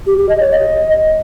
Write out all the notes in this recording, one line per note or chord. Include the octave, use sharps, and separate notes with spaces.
G4
G4
D#5
C#5
D#5